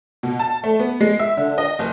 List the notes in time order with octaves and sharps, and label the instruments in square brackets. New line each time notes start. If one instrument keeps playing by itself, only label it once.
[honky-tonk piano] B2
A5
A3
B3
G#3
E5
D3
D#5
F#1